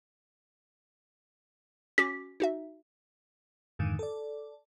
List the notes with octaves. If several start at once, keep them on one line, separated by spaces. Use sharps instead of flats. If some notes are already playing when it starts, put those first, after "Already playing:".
C#4 F#4 D6 B6
D#4 F#4 E5
F2 G#2 D3 D#3
A4 D5